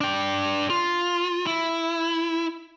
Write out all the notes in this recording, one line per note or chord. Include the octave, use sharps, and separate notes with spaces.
D4 G5
F4
E4